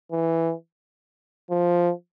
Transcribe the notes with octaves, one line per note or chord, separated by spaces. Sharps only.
E3
F3